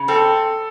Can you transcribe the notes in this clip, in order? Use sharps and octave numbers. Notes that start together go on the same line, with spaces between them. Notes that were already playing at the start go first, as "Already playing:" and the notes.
Already playing: C#3
C4 A4